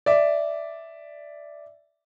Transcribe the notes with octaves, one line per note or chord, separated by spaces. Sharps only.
D5 E5